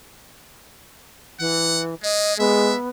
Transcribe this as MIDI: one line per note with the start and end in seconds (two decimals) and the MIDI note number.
1.40 1.95 52
1.40 1.82 78
2.03 2.34 56
2.03 2.34 75
2.39 2.73 56
2.39 2.89 59
2.39 2.76 76